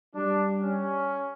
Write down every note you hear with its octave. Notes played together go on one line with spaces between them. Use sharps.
G3 D4
C#4